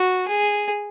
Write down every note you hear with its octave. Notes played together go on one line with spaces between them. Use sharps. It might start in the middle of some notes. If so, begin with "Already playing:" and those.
Already playing: F#4
G#4